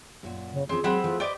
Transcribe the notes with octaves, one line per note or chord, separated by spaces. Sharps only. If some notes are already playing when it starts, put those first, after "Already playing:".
F#2 A#2 F#4
C#3
F3 C4 C#4 G#4
F#3 G#3 C4 B4 F#5 B5
E3 F3 A3
G4 B4 C5 D5 D#5